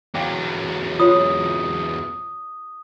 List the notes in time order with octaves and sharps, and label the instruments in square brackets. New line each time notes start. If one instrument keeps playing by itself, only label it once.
[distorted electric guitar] E2 F#3 [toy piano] F5 G5 D6
[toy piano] F4 C#5 [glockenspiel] D#6